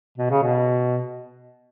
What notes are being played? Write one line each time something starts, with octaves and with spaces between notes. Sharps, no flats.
B2
C#3
B2